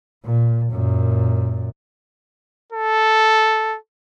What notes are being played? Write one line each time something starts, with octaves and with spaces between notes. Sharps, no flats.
A#2
F#2 A#2
A4